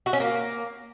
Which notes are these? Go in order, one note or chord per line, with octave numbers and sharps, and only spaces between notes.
F#4
C#4
A#3